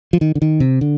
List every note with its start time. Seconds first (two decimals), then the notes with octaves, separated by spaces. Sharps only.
0.13 F3
0.21 D#3
0.35 D3
0.42 D#3
0.60 C3
0.81 D3